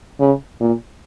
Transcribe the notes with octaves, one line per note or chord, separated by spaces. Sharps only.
C#3
A#2